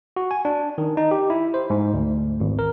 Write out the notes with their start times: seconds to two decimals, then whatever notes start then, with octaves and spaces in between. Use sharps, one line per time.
0.16 F#4
0.31 G#5
0.45 D4
0.78 D#3
0.97 D#4
1.11 G4
1.30 E4
1.54 C5
1.70 G#2
1.94 D2
2.40 G#1
2.59 A#4